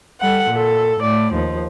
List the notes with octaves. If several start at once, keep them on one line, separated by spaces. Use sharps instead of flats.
G3 A4 F#5
A#2 A4
A2 D5
D#2 F3